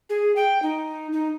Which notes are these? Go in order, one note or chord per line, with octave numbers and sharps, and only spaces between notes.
G#4
G5
D#4
D#4